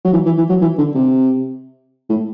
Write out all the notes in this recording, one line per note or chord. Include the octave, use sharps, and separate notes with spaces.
F#3
E3
E3
E3
F#3
E3
D3
C3
A2